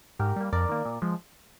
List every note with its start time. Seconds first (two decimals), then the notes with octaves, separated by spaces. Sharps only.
0.19 G#2 G4 A#4
0.36 G3 A#3
0.53 F2 A#4 D5
0.69 D#3 A#3
0.85 A#2
1.02 F3 G#3